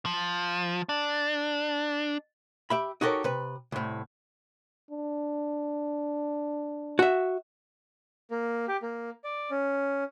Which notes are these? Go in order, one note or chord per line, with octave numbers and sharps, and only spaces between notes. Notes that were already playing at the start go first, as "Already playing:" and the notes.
F3
D4
G4 E5 B5
D#4 F#4 G4 A4 A#4 C#5
C3 B4
C2 A2
D4
F#4 E5
A#3
G4
A#3
D5
C#4